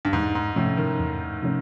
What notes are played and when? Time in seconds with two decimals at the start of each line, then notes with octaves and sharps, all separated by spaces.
0.05 G2
0.13 E2 G#2
0.35 G#2
0.56 A2 C3 F3 A3 C#4
0.77 D#3
0.99 E2
1.43 C3 F3 A3 C#4